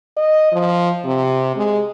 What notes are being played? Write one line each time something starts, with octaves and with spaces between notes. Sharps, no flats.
D#5
F3
C3
G#3